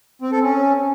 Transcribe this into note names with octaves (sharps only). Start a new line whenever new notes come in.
C4
A4
C#4